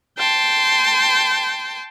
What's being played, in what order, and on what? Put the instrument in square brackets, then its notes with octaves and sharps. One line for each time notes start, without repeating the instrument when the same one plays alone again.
[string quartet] G5 A5 C6